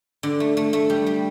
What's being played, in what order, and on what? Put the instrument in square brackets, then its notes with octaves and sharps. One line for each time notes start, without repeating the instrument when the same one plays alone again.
[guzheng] D3
A3
A3
A3
G3
G3